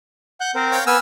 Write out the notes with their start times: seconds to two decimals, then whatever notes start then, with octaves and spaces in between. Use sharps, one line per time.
0.41 F#5 F#6 G6
0.55 C4 A#4 C5
0.72 C#5 F5 G5
0.87 B3 B4 G#5 E6 F6